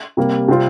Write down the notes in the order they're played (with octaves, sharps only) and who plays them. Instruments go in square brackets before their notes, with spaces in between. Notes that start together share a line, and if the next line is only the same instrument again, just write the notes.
[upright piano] C3 G3 A#3
C3 G3 C4 F4